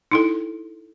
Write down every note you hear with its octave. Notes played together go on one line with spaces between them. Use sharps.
D#4 E4 A4